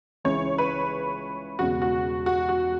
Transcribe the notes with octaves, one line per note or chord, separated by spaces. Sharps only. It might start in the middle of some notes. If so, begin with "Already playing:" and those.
C#2 C#3 E3 C#5
B4
E1 E2 C#3 F#4
F#4
F#4
F#4